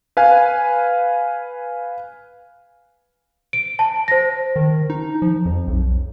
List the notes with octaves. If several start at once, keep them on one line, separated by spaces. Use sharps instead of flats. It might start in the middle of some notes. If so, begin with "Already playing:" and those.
B4 F5 G#5
D7
A5
C5 A#6
D#3
D#4
F3
F2
B1